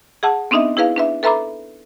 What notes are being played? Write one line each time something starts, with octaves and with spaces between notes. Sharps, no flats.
G#4 F#5 A5
B3 C4 D4 D#4 D#5 E5
E4 G#4 B4 F5
D4 B4 E5
A4 B4 E5 A#5 B5 D6